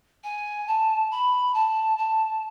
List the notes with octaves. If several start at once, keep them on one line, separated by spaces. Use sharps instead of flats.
G#5
A5
B5
A5
A5